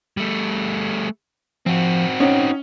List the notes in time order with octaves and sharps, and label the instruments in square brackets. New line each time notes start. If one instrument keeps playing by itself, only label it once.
[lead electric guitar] G3 A3
[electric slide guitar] F3 [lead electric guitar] C4 F#4
[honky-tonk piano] C#4 [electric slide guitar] D#4 F#5 G5